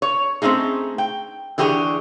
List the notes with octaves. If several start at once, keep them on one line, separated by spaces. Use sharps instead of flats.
C#5
A3 C4 C#4 D#4 G#4
G5
D3 E3 G4 G#4 C5 C#5